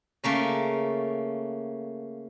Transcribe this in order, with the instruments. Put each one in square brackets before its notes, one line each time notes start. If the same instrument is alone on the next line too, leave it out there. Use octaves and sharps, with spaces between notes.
[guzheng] C#3 A3 A#3 C#4